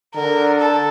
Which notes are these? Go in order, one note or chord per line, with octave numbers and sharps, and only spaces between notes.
D3 A#4
A4